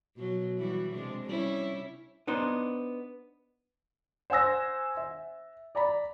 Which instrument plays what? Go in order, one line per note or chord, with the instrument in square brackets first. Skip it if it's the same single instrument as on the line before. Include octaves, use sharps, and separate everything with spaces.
[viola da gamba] B2 F#3
E3 G3 F#4
C3 G#3 D4
G3 C#4 E4
[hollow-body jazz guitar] B3 D4 D#4 C5
[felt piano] C5 F#5 G#5 E6 A#6
E5
D5 A#5 B5